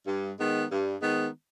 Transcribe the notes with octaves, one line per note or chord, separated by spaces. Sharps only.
G2
D#3 G#3 B3
G2
D#3 G#3 B3